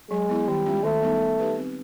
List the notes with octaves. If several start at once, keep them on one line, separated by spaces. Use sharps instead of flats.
F#3 G#3
B3 E4
D#3 G3
G#3 C#4 F4
D#3 A3
G3 B3 D#4
B3
D#4 G4 B4
C4